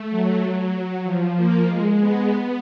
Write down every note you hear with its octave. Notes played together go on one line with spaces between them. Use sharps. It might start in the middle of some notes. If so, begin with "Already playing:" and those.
Already playing: A3
F#3
F#3
F3
A#3
G#3
B3
B3